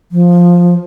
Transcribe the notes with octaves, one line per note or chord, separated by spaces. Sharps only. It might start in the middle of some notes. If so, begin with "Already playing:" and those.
F3